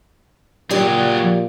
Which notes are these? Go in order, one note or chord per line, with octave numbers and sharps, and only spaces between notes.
A#2 F#3 G4 G#4 D5